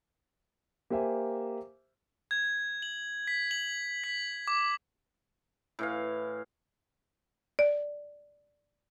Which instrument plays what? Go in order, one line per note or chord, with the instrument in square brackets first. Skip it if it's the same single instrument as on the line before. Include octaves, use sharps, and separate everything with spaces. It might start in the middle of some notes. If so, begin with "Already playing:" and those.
[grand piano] A#3 G4 C5 E5 G#5
[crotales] G#6
F#7
B6
F#7
B6
D6
[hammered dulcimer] A2 E3 F5
[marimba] D5